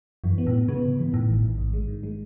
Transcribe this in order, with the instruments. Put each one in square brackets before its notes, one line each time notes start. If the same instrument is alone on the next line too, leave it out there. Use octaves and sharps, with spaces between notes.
[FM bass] F#2 [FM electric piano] E3
[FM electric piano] B3
[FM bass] A2
[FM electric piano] B3
[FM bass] C#3 [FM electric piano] B3
[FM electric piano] G#2
E3
[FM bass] A2 [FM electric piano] D#3
[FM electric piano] A1
A1
G#2
G#3
D#3
G#3